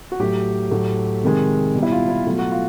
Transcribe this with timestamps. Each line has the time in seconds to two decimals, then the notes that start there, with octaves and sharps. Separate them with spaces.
0.12 F#4
0.19 A2 F#3 A3 G4
0.71 A2 F#3 A3
1.23 C3 D#3 G#3
1.75 B2 G3
1.83 E4
1.92 F4
2.09 E4
2.26 B2 F#3 A3 F4
2.38 F#4
2.52 F4